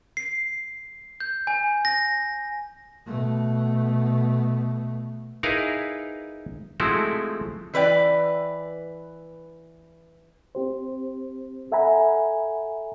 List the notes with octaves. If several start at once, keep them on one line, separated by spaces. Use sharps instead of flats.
C7
G6
G#5
A#6
B2 A3
D#4 E4 G#4 A#4 B4 F5
F3 G#3 A3 C4 E4 F#4
E3 B4 D5 G5
C4 G4 C5
A4 E5 F#5 G#5 A#5 B5